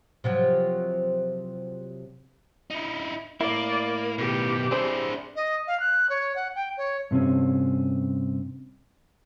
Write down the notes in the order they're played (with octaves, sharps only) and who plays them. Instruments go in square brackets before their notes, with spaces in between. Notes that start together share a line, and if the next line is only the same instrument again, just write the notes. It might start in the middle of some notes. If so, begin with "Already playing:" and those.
[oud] C3 F3 F#3
[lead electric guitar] D#4 E4
[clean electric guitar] A2 E4 [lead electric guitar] A#3 [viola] D5
[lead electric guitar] B2 D#3 [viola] G4
[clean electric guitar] C4 G#4 C5 [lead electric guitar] D4 E4
[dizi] D#5
F5
F#6
C#5
F#5
G5
C#5
[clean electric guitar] G2 C3 C4 C#4